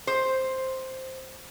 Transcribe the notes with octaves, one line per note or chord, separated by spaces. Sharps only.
C5